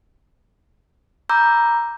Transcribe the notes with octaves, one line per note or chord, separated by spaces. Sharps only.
A#5 B5 D6 E6 G6